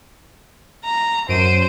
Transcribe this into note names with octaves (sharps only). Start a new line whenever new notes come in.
A#5
F#2 C5 D7 D#7